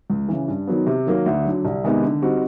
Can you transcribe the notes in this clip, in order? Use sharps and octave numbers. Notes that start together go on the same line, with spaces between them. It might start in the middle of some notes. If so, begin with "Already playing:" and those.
C#2
C#3 E3
G2
D#3 F#3 B3
C3
D#3 F#3 A#3
D2
D3 F#3
C2
C3 D#3 G#3 B3
D3
G3 C4 D#4 F#4